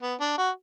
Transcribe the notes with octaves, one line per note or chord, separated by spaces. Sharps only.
B3
D4
F#4